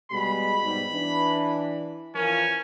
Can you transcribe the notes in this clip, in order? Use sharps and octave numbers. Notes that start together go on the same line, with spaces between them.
B2 G3 G#3 B5
G#2 B2 G3
E3 D4
E3 F3 C#4 A#4